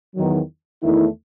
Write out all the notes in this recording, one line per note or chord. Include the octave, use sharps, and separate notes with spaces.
E2 D#3 F#3
E2 D#3 A3 E4